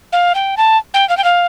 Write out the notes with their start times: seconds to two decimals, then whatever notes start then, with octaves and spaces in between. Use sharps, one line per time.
0.12 F5
0.35 G5
0.57 A5
0.94 G5
1.09 F5
1.17 G5
1.24 F5